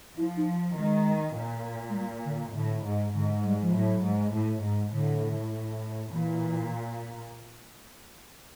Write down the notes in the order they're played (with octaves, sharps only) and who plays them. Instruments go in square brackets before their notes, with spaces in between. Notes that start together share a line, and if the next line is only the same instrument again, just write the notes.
[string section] F3 [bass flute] E4
[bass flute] D#4
[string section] D#3 [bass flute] G#3
[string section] A#2
[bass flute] G#3
G3
D3
[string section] A2 [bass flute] D3
[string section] G#2
[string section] G#2 [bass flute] D3
[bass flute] G3
F3
[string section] A2 [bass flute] F#3
[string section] G#2
A2
G#2
[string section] A2 [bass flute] D3
[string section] A#2 [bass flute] E3